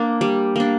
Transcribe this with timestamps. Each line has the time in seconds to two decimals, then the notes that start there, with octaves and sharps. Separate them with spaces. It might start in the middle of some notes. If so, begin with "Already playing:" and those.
Already playing: A#3 D4
0.21 G3
0.56 A#3 D4